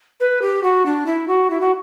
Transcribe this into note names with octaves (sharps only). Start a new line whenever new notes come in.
B4
G4
F#4
D4
E4
F#4
E4
F#4